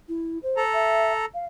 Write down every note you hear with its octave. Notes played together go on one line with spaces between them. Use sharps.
E4
C5
A4 A#5
E5
F5